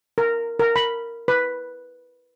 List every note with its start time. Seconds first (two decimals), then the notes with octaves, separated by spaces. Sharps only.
0.18 A#4
0.59 A#4
0.76 B5
1.28 B4